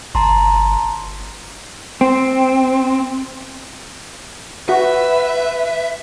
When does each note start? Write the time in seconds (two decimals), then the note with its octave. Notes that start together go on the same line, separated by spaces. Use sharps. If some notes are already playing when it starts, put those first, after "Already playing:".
0.15 G1 A5 A#5 C6
2.01 C4
4.69 F#4 B4 E5